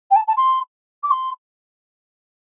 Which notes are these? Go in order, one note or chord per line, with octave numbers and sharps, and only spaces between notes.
G5
A5
A5
C6
D6
C6